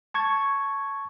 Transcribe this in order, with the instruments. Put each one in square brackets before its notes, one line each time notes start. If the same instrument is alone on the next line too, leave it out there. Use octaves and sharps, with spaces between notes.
[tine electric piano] A5 C#6 G#6